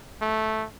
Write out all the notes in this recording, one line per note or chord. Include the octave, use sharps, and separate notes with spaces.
A3